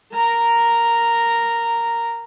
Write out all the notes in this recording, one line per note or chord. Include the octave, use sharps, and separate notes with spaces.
A#4 A#5